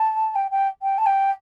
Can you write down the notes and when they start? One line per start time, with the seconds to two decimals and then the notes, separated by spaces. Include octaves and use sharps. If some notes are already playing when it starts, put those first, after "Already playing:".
Already playing: A5
0.35 G5
0.51 G5
0.82 G5
0.98 A5
1.06 G5